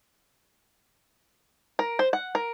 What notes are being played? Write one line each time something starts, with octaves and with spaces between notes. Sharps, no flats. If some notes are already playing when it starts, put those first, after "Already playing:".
A#4
C5
F#5
A#4